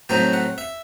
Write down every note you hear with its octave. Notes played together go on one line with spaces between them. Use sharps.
A2 F#3 A3 C4 D#4 G5
F#5
E5